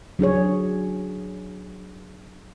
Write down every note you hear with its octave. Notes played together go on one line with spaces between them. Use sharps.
F#3 D4 G#4 C#5